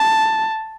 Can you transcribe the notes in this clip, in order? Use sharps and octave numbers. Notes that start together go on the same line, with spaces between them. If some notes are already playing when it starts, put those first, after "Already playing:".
Already playing: A5